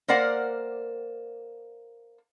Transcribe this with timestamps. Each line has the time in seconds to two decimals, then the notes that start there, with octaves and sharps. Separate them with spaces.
0.08 A#3 A#4 C5 D5 F#5